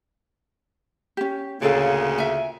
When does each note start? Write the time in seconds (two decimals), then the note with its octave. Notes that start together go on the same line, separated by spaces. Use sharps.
1.17 C#4 G4
1.62 D2 A#2 C#3 G#4 A4 F5
2.18 E5 G#5